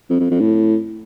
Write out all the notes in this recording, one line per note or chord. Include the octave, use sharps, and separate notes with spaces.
F2
F2
F2
A2